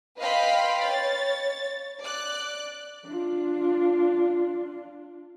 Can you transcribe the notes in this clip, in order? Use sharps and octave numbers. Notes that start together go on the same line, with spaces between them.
B4 D#5 F5 G5 B5 C6
C#5 A6
D5 F#6
D4 F4